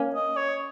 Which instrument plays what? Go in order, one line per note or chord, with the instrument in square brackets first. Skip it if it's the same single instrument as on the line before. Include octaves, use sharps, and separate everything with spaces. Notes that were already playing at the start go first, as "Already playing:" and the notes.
Already playing: [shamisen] A#3 C#4
[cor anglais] D#5
C#5